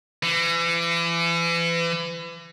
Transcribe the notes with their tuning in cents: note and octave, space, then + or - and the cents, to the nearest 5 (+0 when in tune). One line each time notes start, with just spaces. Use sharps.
E3 +35